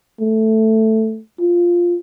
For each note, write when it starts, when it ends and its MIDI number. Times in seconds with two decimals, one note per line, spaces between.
0.20 1.20 57
1.40 1.97 65